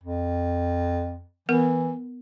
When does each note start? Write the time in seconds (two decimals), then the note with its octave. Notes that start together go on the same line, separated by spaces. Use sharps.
0.03 F2
1.49 E3 B3 A#4